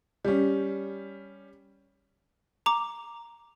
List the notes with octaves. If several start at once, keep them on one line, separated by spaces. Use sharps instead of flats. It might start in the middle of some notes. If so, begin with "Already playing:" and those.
G3 C#4
A#5 D6